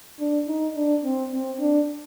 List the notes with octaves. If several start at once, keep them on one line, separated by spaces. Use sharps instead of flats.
D4
D#4
D4
C4
C4
D4